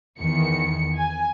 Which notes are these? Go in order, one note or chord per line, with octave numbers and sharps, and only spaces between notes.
E2 D#3 C#7
G#5